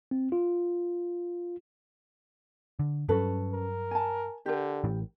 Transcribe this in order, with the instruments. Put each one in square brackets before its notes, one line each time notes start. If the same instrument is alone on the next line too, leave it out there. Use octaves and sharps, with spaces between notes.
[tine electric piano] C4
F4
[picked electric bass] D3
[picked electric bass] G2 F#3 [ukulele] C#4 A4 B4
[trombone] A#4
[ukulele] G#5 A5
[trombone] D3 [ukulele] G4 A#4
[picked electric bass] A1 A2 E3